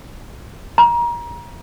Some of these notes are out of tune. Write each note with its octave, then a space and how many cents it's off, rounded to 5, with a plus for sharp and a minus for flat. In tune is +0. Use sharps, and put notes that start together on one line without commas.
A#5 +30